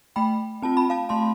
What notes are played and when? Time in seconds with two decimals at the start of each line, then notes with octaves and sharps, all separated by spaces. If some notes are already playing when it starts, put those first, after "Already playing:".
0.16 A3 G5 B5
0.62 C4 F4 A5
0.77 B5
0.90 F5 A5
1.09 A3 A5 C6